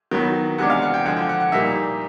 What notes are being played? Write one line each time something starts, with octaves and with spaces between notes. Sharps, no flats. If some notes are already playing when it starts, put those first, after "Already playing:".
D#3 F#3 B3
C3 E3 G#3 B3 D4 F#5
F5
F#5
G5
D3 F3 G#3 F#5
G5
F#5
F#5
A#2 G3 A#3 D#4 E5